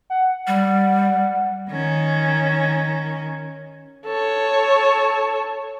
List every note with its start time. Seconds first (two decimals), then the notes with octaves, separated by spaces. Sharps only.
0.10 F#5
0.47 G3
1.69 D#3 C#4
4.06 A4 C#5